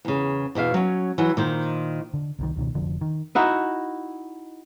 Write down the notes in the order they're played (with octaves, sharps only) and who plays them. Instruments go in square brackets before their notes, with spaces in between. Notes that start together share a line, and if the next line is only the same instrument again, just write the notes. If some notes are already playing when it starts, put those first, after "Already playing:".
[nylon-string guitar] E2 C#3
E2 B2 E5 F5
F#3 C#4
E3 F#3 F#5
A#2 D#3 C5
[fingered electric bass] D3
C2 D3 D#3
C#2 B2 D#3
F1 D3 F3
D#3
[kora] D#4 E4 F#4 D#5